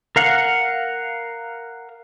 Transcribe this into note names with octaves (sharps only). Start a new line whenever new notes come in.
A#4 F5 F#5